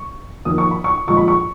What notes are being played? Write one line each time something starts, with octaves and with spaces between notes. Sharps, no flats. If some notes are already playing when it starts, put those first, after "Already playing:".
Already playing: C#6
F2 D#3 A#3 D#6
C#6
B5
C#6
A#2 F3 G#3 C#6
B5
C#6